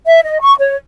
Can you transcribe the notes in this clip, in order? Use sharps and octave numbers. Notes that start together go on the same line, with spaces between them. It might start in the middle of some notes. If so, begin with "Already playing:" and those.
E5
D#5
C#6
C#5